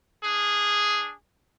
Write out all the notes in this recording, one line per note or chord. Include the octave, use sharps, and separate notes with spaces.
D4 G#4